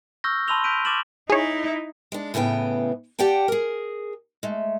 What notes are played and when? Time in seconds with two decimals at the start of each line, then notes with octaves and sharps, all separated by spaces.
0.24 C#6 E6 F6 G6 A#6
0.48 A5 B5 C6 E6 F7 G7
0.64 F6 G6 B6 D7 D#7
0.85 D6 F6 A6 E7 F#7
1.30 D#4 E4 G#4 C#5
2.12 G#3 D4
2.34 A2 C#3 E3 B3 G5
3.19 G4 D5 F#5 G5 A5
3.48 G#4 A#4
4.43 G#3 A3